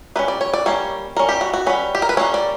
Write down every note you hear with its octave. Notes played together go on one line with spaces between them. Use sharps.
G3 A#3 C#4 B4
D5
C#5
D5
G3 A#3 C#4 C#5
G3 C#4 A#4
G4
F#4
F#4
G3 C#4 B4
G4
A#4
B4
G3 A#3 C#4 C#5
D5